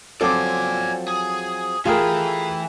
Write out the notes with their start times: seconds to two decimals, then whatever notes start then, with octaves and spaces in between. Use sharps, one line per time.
0.21 F3 F#3 C4 A4 D5 G#5 D6
1.08 G#4
1.85 E3 A3 F4 G4 G#4 A#4 B4